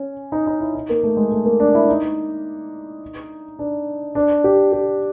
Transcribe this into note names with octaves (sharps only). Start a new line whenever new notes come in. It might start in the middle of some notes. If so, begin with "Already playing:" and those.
Already playing: C#4
D#4
D#4
E4
D#4
A#3
A3
G#3
A3
A#3
D4
E4
D#4
D4
D4
G4
G4